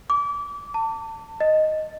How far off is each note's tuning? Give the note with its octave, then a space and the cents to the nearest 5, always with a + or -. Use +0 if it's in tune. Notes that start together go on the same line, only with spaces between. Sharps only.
D6 -25
A5 +30
D#5 +0